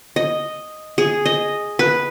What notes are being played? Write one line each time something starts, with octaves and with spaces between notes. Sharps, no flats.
D#5
G#4
D#5
B4